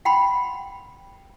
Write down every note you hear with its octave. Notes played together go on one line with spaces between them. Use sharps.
F#5 G5 B5 C6